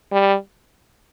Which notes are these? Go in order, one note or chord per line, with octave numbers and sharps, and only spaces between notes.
G3